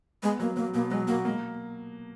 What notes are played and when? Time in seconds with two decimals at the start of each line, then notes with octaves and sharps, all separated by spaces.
0.23 G#3 B3
0.40 F#3 A#3
0.56 F#3 A#3
0.74 B2 A#3
0.90 F#3 G#3
1.08 A#3 F#4
1.25 G#3 A#3